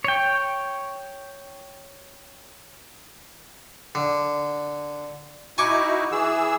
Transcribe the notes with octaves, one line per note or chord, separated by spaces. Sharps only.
C#5 G5
D3
D#4 E4 F#4 G#5 C#6 D6
E3 G#4 E6